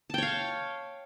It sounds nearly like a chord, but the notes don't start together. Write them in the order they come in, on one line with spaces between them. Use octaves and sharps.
A5 G5 C#5 F5